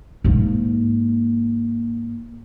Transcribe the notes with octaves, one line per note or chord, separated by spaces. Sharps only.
G#2 A#3